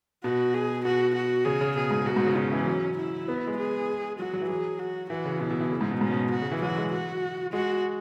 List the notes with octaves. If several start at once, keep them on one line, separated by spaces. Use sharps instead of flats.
B2 F#4
G#4
B2 F#4
F#4
C#3 G#4
C#3
B2 G#4
G#2
B2 F#4
G#2
C#3
C#3 C#4
E3
F#3
E4
B3
G#3
G#4
F#3 F#4
F#3
E3
F#3 G#4
F#4
E3 F#4
C#3
B2 E4
B2
E3
C#3
G#2
B2
G#2 C#4
B2
F#4
C#3
E3
F#3 F#4
G#3
F#4
G#3 F#4